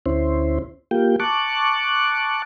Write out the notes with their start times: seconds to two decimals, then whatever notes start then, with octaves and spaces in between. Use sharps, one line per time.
0.06 D2 C#4 E4 C5
0.91 A#3 F4 G4 G5
1.20 A5 C#6 D6 F#6